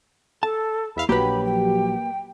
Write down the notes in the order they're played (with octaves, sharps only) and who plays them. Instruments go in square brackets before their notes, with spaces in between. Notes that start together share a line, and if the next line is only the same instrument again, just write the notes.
[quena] A4 [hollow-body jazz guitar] A5
[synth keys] E2 E5 F5 [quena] B5
[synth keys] A#1 F#3 G4 [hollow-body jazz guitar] A#3 B4 [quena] B5
[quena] G5